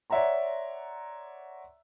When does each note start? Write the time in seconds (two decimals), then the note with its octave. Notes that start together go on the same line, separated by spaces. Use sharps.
0.10 C#5 D5 E5 F#5 A#5 C6